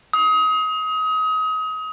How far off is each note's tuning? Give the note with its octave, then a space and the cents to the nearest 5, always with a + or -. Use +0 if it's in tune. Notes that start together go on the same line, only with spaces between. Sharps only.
D#6 +30